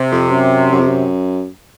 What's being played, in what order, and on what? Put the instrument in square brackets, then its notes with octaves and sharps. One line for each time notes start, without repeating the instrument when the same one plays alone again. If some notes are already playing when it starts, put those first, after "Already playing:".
Already playing: [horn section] C3
[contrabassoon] F2
F#2
F#2
F2
F#2